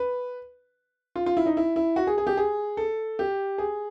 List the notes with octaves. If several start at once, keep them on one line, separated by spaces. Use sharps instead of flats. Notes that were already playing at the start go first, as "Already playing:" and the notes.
Already playing: B4
F4
F4
E4
D#4
E4
E4
F#4
G#4
G#4
G4
G#4
A4
G4
G#4